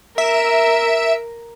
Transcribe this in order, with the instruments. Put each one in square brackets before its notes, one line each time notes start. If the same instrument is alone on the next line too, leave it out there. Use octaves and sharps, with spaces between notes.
[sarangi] A#4 [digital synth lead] E5